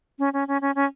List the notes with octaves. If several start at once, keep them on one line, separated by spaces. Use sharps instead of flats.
C#4
C#4
C#4
C#4
C#4